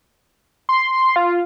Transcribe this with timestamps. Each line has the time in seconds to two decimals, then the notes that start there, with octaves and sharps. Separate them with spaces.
0.69 C6
1.16 F4